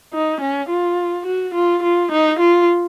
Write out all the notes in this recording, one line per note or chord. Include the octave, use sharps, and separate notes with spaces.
D#4
C#4
F4
F#4
F4
F4
D#4
F4